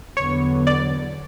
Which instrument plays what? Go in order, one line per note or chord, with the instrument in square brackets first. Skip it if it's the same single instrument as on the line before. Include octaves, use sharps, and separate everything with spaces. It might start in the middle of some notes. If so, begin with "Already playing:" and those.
[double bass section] E2 D3 F#3 B3 [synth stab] C#5
[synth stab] D5